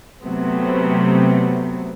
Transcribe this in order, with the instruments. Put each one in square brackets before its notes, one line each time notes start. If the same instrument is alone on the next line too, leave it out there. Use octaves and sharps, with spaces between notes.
[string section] C3 F#3 A3 B3 C4